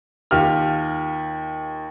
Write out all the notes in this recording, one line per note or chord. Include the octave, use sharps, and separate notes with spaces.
D#2 F4 G4 F6